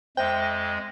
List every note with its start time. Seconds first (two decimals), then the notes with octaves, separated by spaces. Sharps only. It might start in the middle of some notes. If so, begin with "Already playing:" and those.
0.17 F2 G#3 C5 E5 G5